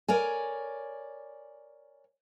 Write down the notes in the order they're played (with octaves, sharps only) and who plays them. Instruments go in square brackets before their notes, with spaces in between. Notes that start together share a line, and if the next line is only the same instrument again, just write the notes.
[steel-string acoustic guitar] A#4 C#5 D5 G#5